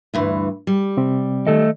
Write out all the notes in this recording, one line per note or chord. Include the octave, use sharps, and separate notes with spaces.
D2 G2 E3
G3
C3 C4 G4
D#3 A3 A4 D#5